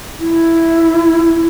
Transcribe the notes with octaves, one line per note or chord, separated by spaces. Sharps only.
E4